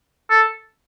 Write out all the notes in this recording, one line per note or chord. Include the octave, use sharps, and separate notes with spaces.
A4